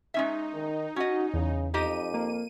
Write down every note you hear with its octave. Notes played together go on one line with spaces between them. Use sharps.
G#3 C#4 D#4 E5
D#3
C#4 F#4 D#5
E2 C#3
F2 D#4 G4 D#5 D#7
A#3